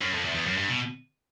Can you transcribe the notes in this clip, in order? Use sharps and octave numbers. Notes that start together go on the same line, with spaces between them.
F#2
F2
E2
E2
F#2
G2
B2